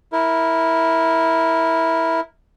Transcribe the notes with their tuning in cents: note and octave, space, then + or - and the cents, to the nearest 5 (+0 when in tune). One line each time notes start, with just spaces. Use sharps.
E4 -10 A#4 +0